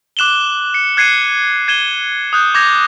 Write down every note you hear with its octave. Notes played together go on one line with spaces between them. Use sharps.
D6 F#6 E7 F#7 G7
C#7
F#6 G#6 C7 C#7 D#7
G#6 D#7 E7 G7
D#6 F#6 G6
D6 G6 G#6 A#6 F7